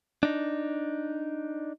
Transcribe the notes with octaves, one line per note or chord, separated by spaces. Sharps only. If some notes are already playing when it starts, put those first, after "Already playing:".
D4 D#4